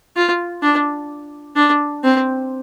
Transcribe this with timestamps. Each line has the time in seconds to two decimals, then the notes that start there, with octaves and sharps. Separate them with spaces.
0.16 F4
0.62 D4
1.56 D4
2.04 C4